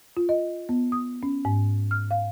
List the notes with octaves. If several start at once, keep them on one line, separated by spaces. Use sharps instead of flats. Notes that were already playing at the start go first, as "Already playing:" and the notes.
F4
D#5
B3
D#6
C#4
G#2
F6
F5